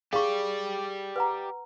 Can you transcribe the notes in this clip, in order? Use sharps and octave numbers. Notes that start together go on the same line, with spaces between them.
G4 G#4 D5 F5 C#6
B4 F#5 A#5